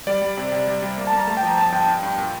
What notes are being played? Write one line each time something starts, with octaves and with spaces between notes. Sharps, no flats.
G3 D5
G3
C3
C3
G3
G3
A#3
A5
A#3
A#5
A3 A5
G5
F3 A#5
G1 A5
G2 G5
G2
G2
A#2